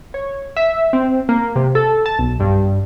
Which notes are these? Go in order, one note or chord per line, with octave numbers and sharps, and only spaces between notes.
C#5
E5
C4
A#3
C3
A4
A5
B1
G2